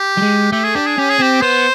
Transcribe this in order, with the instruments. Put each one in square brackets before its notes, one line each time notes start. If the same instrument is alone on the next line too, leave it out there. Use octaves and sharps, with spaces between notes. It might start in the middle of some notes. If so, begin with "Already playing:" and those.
Already playing: [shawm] G4
[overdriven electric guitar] G3
G#3
[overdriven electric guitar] A3 [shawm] G4
[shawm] G#4
[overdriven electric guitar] D4 [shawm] G4
[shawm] G#4
[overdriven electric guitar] C#4 [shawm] G4
[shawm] G#4
[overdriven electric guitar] C4 [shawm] G4
[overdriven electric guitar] B3 [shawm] C5